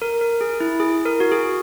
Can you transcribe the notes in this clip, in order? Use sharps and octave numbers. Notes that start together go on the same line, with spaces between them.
A#4
A#4
G#4
E4
G#4
A#4
F#4
G#4